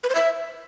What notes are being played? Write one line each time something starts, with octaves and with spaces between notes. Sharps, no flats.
B4
C5
E5